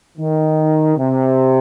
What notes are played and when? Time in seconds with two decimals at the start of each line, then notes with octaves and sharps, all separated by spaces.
0.18 D#3
0.97 C3